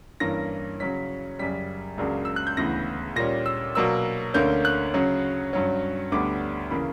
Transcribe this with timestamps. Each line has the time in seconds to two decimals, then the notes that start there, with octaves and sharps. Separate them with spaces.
0.20 G2 E3 A#3 C#4 A#6
0.80 C#3 F#3 C#4 B6
1.39 F#2 C#3 G3 B6
1.98 C#2 C#3 F#3 A#3 D4
2.25 E6
2.36 F#6
2.47 G6
2.57 D2 C#3 E3 B3 A#6
3.16 A#2 G3 C#4 A#6
3.46 E6
3.75 B2 F#3 A#3 D4 E6
4.34 D2 D3 A#3 C#4 G6
4.65 F#6
4.94 C#3 F#3 C#4
5.53 G2 F#3 C#4
6.12 D2 D3 G3 B3 D4 D6
6.71 C#3 E3 A#3 B5